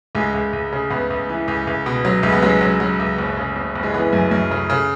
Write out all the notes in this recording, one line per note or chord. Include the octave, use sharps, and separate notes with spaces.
C#2 G#3
C#2
C#2
C#3
C#2 B3
C#2
E3
C#2
C#2
B2
F#3
C#2 G#3
B3
F#3 G#3 C#4
F#3
F#3
C#2
F#1
C#3
F#1
F#1
G#3
E3 B3
F#2
F#2
C#3
C#3